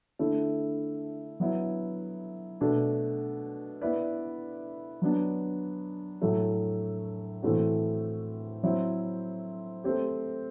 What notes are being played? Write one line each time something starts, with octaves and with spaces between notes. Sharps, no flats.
D3 A3 E4
F#3 B3 E4
B2 A3 D4
B3 E4 B4 D5
F#3 B3 D4
A2 F#3 A3
A2 E3 A3 C4 F#4
F#3 C4 E4
A3 C4 G4